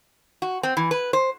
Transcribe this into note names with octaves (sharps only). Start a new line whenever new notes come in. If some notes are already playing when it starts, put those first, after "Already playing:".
F#4
C4
E3
B4
C5